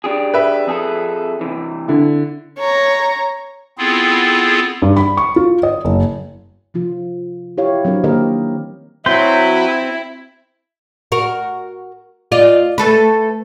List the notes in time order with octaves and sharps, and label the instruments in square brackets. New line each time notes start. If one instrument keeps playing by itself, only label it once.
[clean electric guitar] D4 G4 G#4
[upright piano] B4 E5
[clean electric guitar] F2 G#4 A4
C3 E3
[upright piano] D3 E4
[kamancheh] C#5 A#5
[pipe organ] B3 C4 E4 F4 G#4 A4
[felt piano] G2
B5
C#6
F4
D#5
F#1
[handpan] C3 F3 F4
E4 G4 C#5 F5
F#3 C4 D4 A#4
D#3 F#3 A#3 G4 A#4 D#5
[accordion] F#3 [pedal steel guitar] C4 C6 G6 [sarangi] E4 [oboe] B4
[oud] F#4 A#4
F4 D5 D#5
A3 A4 B4